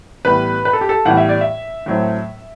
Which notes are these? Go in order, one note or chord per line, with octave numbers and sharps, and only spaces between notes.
A2 E3 G3 B3 B4
B4
A4
G4
A4
A2 E3 G3 B3 F#5
E5
D5
E5
A2 F#3 A3 C4